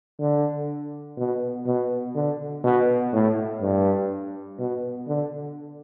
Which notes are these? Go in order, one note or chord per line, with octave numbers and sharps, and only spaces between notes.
D3
B2
B2
D3
B2
A2
G2
B2
D3